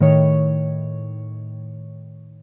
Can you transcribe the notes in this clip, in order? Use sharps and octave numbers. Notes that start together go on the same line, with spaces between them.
A2 D#3 C#5